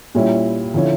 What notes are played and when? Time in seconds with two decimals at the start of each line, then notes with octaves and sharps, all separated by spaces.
0.15 A#2 G3 C#4 E4
0.74 D3 F3 C#4 E4